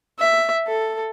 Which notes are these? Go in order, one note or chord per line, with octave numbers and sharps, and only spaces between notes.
E5
A4